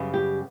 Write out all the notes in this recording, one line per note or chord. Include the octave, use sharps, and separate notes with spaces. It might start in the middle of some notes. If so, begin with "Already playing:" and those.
Already playing: F#2 C#3 G3 B3
G4